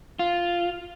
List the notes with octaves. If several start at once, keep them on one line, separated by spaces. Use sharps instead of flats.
F4